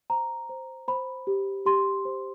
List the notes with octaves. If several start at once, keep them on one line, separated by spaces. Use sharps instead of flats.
C5 A#5
C5
C5 B5
G4
G4 C6
C5